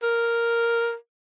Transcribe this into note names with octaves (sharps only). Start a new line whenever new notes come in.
A#4